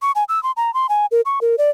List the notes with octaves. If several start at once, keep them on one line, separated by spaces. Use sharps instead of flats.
C#6
G#5
E6
C6
A#5
C6
G#5
A#4
C#6
A#4
D5